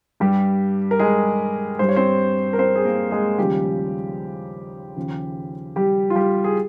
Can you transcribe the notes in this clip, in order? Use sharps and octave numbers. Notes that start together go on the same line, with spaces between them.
G2 G3 G4
A#4
G#3 G#4
G2 G3 C5
C#5
C4 C5
A#4
C4 C5
G#4
A#3 A#4
G#3 G#4
D#2 C#3 F3 G3 G4
D#2 C#3 F3
G3 G4
F4
G3 G4
G#4